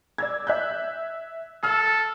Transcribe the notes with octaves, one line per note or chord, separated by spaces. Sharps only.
D5 E6 G#6
E5 F#6 G6
A4 E6 F6